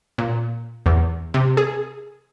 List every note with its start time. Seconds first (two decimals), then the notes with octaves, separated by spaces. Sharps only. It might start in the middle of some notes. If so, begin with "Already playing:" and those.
0.18 A#2
0.86 E2
1.34 C3
1.57 G#4